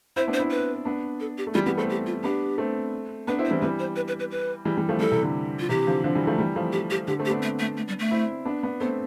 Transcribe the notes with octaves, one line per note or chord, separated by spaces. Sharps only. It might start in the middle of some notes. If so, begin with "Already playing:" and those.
C4 E4 C5
B3 D4
C5
C4 E4
B4
B3 D4
A4
G4
A3
E3 G3 F4
G3 B3 G4
A3 C4 A4
G4
F4
B3 D4 G4
A3 C4
B3 D4 B4
C4 E4
C5
E3 G3
E3 G3 B4
C5
B4
B4
B4
B4
E3 G3
E3 G3
F3 A3
E3 G3 A4
C3 E3
D3
F4
C3 E3 G4
D3 F3
D3 F3
E3 G3
F3 A3
E3 G3
F3 A3
G4
G4
D3 G4
A3 C4
G4
B3 D4
A3
A3
A3
G3
A3
C4 E4
B3 D4
B3 D4
A3 B3 C4